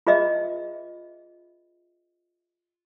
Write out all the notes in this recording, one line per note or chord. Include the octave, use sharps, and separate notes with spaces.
F4 G#4 B4 D#5 E5